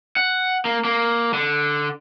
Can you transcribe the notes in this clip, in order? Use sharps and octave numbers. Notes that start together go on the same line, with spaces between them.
F#5
A#3
A#3
D3